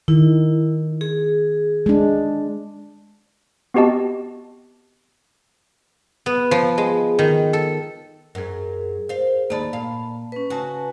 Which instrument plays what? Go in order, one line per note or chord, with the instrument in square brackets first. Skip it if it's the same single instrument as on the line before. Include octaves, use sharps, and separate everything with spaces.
[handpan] D#3 [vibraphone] E4
[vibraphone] G#4
[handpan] G#3 D4
[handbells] B3 C4 F#4 G4 D#5 A5
[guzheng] B3
F3
G#3
D#3
A4
[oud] F#2 [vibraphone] G#4 A#4
[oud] C5 F5
[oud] D#2 D5 [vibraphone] A#3 A5 B5
[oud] A#2 F5
[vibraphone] C#4 B4
[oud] C#3 F#4 [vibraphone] B4 G#5 A5